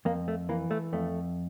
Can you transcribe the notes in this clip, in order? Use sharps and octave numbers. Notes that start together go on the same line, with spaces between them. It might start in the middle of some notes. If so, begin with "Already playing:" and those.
F2 A#3
A3
E3 A#3
A3
F2 A3